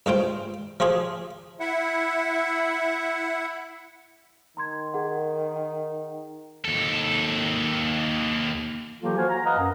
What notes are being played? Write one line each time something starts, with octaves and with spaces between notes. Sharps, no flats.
G2 G#3 F4 C5 G5
F3 F4 G4 G#4
E4 E5 F#5
D#3 A#5 C6 G#6
G#4 A#4 F#5
D#2 A4
E3 F#3 A#3 F4 G4 A4
F#4 C5 F5 G#5
A#5
B4 D#5 F5 F#5 A#5
F#2